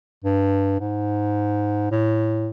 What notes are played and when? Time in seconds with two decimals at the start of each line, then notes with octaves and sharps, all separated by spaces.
0.24 G2
0.80 G#2
1.91 A2